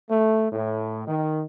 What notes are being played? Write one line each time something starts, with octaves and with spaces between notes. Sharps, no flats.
A3
A2
D#3